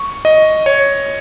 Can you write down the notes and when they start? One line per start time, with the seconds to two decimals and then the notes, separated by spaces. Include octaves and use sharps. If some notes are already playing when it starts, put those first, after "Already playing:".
Already playing: C#6
0.25 D#5
0.66 C#5